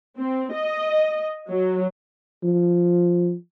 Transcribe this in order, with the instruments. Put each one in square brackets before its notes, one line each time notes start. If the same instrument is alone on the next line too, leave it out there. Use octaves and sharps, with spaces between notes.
[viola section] C4
D#5
F#3
[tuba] F3